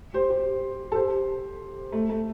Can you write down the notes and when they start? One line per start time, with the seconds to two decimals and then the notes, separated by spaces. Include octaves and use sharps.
0.14 G4 C5
0.30 G4 C5
0.92 A4
0.95 G4 C5
1.92 A3
2.09 A3